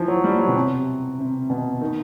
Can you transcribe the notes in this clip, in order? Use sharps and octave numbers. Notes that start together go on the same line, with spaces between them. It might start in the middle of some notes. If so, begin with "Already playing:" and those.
Already playing: E3 F3
F#3
G3
F#3
B2
C3
C3
B2
D#3